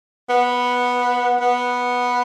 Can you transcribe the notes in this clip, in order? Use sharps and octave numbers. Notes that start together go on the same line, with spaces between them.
B3
B3